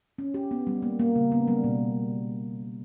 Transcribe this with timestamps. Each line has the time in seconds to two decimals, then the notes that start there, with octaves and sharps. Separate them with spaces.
0.19 C#4
0.34 G4
0.51 B3
0.67 G3
0.82 A#3
0.99 A#3
1.16 C#3
1.32 B3
1.47 G3
1.64 B2